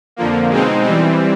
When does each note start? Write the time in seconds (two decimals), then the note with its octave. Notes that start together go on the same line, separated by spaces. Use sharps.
0.16 F2 D3 F3 A#3
0.50 B2 G#3 C4 D#4
0.84 E3 G3 C4